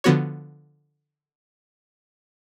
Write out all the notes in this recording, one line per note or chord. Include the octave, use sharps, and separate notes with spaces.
D3 F3 B3 F#4 C#5